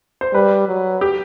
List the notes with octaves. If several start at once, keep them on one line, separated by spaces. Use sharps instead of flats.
C5
G3 B4
F#3
G4